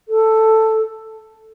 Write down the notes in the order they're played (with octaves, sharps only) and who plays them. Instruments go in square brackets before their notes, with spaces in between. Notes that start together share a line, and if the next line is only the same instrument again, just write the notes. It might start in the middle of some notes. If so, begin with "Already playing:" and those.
[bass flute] A4